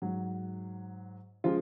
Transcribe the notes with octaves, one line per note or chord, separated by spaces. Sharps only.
G#2 F#3
C#3 F3 G#3 F4